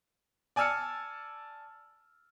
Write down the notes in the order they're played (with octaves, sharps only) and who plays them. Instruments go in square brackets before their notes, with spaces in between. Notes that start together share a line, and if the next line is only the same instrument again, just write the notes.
[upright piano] D5 G#5 A5 E6 F6 C#7